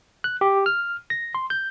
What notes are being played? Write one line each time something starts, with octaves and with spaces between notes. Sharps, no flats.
F#6
G4
F6
A#6
C6
G6